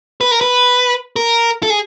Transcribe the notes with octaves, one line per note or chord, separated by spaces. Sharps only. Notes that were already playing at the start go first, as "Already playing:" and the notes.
B4
A#4
B4
A#4
A4
G#4